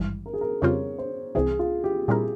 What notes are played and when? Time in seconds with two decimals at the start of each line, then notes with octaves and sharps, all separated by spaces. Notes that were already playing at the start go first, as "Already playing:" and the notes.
Already playing: G#1 G2 E3 G3
0.26 A#4
0.34 G#4
0.41 A#4
0.62 F2 C#3 G3 C4 F4 C#5
0.98 C5
1.35 C2 C3 E3 G#4
1.59 F4
1.84 G4
2.08 A#2 G3 C4 E4 G#4 A#4